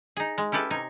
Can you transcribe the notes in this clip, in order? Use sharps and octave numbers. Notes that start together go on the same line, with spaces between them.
D#4 G#4
G#3
C#4 E4 G4 A4 B4
C3 D#4 G#5